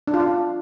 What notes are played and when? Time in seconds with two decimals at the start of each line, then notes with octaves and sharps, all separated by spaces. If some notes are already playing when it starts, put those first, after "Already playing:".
0.08 D4
0.14 F4
0.20 D4